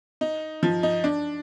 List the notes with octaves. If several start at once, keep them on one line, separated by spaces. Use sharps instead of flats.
D#4
F3
D#4
D4